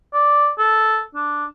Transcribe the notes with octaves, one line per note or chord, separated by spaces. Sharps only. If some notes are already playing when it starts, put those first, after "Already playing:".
D5
A4
D4